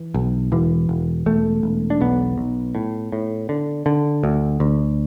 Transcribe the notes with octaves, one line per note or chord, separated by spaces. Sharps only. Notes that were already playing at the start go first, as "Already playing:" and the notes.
Already playing: E3
B1
E1 E3
E1
E1 A3
E1
D4
B1 B3
B1
A2
A2
D3
D3
D2
D2